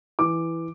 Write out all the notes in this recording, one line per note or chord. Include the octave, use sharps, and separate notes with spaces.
E3 D6